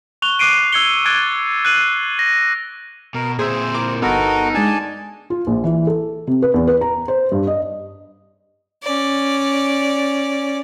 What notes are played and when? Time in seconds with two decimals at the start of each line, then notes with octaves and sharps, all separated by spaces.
0.22 C#6 F#6 F7 G7
0.39 D6 F#6 C7 D7 D#7
0.72 E6 G#6 C#7 G7
1.05 D6 F#6 G#6 A6 D7 G7
1.65 F#6 C7 D#7 F#7
2.19 A#6
3.14 B2 A#4
3.39 A#2 C4 G#4 C5 E5
3.74 E4 A#4 D6
4.02 G1 B3 D#4 F#4 A4 A#4
4.54 G#3 D4 D5 G#5 A5
5.30 F4
5.47 A#1
5.64 E3
5.87 A4
6.27 C3
6.42 B4
6.54 E2
6.67 B4
6.81 A#5
7.08 C5
7.32 G2
7.47 D#5
8.83 C#4 D5